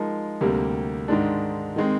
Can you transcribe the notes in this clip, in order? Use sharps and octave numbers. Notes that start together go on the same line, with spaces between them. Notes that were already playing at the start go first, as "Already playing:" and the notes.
Already playing: F3 G#3 D#4 A#4
D2 C3 G3 A#3
G#2 D#3 G#3 D4
D#3 G#3 C4